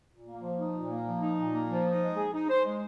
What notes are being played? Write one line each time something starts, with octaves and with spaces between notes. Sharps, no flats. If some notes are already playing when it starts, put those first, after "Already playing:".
A#2
A#3
F3
D#4
A#2
A#3
F3
D#4
A#2
A#3
F3
D#4
G#3
G#4
D#4
C5
G#3